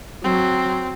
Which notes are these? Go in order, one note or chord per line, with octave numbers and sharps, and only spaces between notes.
F#3 C4